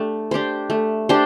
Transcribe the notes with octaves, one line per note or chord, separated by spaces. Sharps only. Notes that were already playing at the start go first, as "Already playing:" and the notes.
Already playing: A3 D4 G4
D4 G4 C5
A3
D4 G4 C5